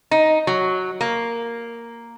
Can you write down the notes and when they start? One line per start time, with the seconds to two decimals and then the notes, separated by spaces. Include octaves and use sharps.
0.11 D#4
0.47 F#3
1.01 A#3